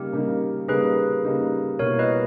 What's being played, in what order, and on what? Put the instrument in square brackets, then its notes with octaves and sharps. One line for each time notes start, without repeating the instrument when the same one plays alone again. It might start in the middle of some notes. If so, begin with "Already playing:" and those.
Already playing: [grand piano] C#3 G3 A#3 D#4 [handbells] G4 A#4
[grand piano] C#3 G3 A#3 D#4
[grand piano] C#3 G3 A#3 D#4 [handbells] G#4 B4
[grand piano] C#3 G3 A#3 D#4
[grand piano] B2 G3 A#3 E4 [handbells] A#4 C#5
[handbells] B4 D#5